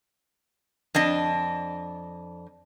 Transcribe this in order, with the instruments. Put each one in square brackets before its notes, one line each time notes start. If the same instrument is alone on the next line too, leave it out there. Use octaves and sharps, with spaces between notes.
[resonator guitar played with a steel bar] F2 D4 D#5